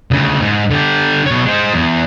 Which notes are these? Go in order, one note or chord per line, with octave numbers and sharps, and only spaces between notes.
D2 C#3
G#2
D3 G4
B2 C#5
G#3 C5
E2